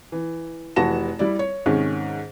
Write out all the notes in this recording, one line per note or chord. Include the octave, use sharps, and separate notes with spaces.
E3
F1 E3 F#4 A5 A#6 E7
G3 E4 D5
C#5
G#2 C3 D#3 C#4